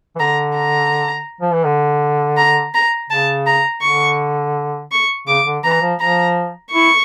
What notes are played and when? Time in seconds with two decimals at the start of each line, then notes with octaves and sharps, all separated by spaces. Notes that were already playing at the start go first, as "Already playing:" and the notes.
0.16 E3
0.20 D3 A#5
0.56 A#5
1.41 F3
1.53 E3
1.65 D3
2.37 A#5
2.74 A#5
3.10 C#3 A5
3.47 A#5
3.82 D3 C#6
4.92 C#6
5.27 C#3 D6
5.47 D3
5.64 E3 A#5
5.82 F3
6.00 F3 A#5
6.72 E4 C#6